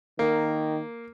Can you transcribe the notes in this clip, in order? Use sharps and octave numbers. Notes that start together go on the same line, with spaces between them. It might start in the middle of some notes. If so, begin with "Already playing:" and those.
D#3 A#3